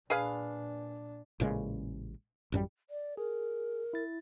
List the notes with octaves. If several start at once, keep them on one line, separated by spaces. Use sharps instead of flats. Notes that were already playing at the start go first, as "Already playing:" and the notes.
A#2 D4 G#4 B4 F5
A1 A#2 C#3 G#3
A1 F#2 G3
D5
G#4 A#4
E4 A6